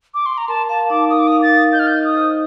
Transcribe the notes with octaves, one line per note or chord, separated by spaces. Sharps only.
D6
C6
A#5
A#4 A5
F5 A5
D#4 D6
A#4 D#6
D6
F5 D#6
A6
D#4
D#5 G6
F6
G6
D#4
D#6
C5